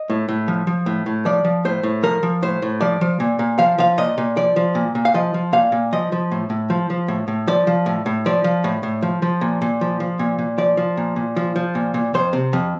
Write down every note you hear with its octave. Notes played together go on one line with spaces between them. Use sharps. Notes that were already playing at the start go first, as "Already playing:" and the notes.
Already playing: D#5
A2
A2
F3
F3
A2
A2
F3 D5
F3
A2 C5
A2
F3 A#4
F3
A2 C5
A2
F3 D5
F3
A#2
A#2
F3 F5
F3 F5
A#2 D#5
A#2
F3 D5
F3
A#2
A#2
F5
F3 D#5
F3
A#2 F5
A#2
F3 D#5
F3
A2
A2
F3
F3
A2
A2
F3 D5
F3
A2
A2
F3 D5
F3
A2
A2
F3
F3
A#2
A#2
F3
F3
A#2
A#2
F3 D5
F3
A#2
A#2
F3
F3
A#2
A#2
F2 C5
C3
F2